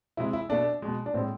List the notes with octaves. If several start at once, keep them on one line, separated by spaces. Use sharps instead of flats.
C3 G#3 E4
E4
B2 A3 D4
B2 G#3
D4
A2 G#3 C4